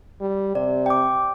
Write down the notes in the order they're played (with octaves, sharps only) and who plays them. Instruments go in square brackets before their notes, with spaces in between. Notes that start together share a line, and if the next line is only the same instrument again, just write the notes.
[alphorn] G3
[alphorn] C3 [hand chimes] D5
[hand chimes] G5 D6